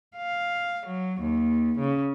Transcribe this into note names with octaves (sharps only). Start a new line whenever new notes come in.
F5
F#3
D#2
C#3